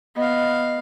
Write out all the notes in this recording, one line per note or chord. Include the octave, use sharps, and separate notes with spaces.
B3 D#5 F5